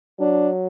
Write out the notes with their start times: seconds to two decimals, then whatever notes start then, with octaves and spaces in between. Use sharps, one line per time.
0.19 F#3 D4